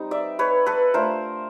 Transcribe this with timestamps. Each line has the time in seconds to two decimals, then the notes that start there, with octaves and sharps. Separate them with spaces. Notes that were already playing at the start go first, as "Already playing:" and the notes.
Already playing: G3 C4 D#4
0.11 D5 E5
0.39 B4 C#5
0.66 A4 B4
0.94 A3 D4 F4 A#4 C5